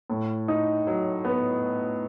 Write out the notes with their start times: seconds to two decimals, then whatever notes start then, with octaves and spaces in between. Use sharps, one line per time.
0.10 A2
0.48 D#4
0.87 F#3
1.25 B3